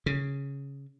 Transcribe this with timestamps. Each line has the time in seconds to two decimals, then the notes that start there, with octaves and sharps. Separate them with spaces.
0.06 C#3